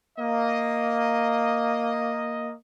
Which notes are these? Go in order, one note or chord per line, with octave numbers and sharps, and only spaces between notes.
A#3 D#5